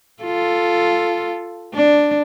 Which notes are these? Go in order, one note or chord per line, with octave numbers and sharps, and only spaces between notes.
F4 A4
D4